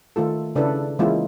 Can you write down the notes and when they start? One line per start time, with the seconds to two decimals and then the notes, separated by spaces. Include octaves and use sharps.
0.16 D#3 A3 F4 A4
0.55 C#3 D4 E4 A4 B4
0.99 E3 G#3 A#3 C#4 E4 F4